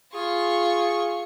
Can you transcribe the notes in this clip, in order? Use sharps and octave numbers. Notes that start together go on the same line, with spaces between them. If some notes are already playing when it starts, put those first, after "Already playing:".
F4 G#4 C#6